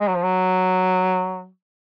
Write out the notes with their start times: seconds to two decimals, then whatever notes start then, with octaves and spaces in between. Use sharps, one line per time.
0.01 G#3
0.08 F#3
0.16 F3
0.23 F#3